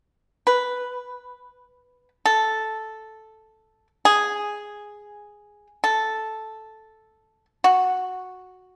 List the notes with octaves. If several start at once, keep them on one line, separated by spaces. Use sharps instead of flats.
B4
A4
G#4
A4
F#4